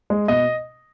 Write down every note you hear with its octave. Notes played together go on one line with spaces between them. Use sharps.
G#3
B2 D#5